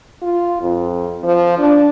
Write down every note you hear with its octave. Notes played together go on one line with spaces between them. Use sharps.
F4
F2
F3
D4